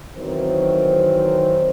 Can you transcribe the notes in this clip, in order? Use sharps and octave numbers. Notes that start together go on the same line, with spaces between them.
D#3 E3 F#3 C4 A#4 C5